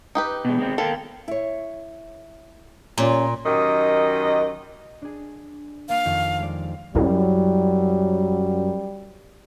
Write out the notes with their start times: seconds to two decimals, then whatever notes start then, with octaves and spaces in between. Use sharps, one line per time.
0.15 D#4 G4 B4
0.45 B2 G#3
0.58 G#3 C4
0.78 A4 A#4 F5 G5
1.28 E4 C#5
2.98 A#2 G3 C#4 F4
3.46 F#2 D#3 G4 D#5
5.02 D4 G#4
5.89 A#3 F5
6.05 F2 D#3
6.38 G#3 D5
6.95 F#2 G3 E4